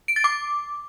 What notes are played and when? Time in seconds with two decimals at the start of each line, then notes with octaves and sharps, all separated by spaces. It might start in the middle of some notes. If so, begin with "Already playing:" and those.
0.08 D7
0.16 A6
0.24 D6